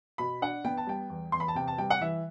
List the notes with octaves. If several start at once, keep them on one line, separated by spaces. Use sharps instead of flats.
B2 B5
D4 F#5
B3 G5
A5
G3 G5
E2
E2 C6
B5
A5
C3 G5
A5
G3 G5
F#5
E3 E5